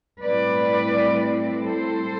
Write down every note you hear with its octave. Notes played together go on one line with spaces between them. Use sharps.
A2 G3 C4 E4 B4 D5
A4 C5